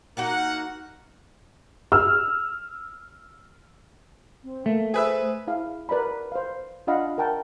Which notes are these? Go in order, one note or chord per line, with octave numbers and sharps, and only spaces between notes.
A#3 D#4 F#4 A#4 F#5
E6 F6
C4
A3 A#3
G#4 B4 C5 E5
E4 G#4 F5
A#4 B4 D5 A#5 B5
C5 F5
D4 F4 D#5 F5 F#5 B5
A#4 F#5 G5 A5